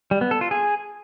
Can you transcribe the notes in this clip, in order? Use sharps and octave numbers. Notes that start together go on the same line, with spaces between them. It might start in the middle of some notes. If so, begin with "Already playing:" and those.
G3
B3
A4
F4
G#4